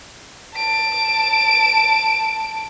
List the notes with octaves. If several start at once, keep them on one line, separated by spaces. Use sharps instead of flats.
A5 D7